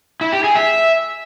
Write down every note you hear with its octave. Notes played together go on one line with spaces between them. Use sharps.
E4
G4
G#4
E5